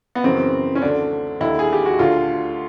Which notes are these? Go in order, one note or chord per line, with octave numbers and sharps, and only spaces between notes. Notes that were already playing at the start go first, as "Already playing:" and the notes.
B3
F#2 C#3 E3 C4
C#4
D2 D3 D4
D#2 D3 E4
G#4
G4
F#4
D2 D3 F4